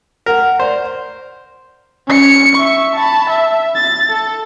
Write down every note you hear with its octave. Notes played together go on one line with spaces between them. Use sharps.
A#4 F#5
C5 D5
C#4 C#7
E5 C#6
A5 B5
E5
A6
A4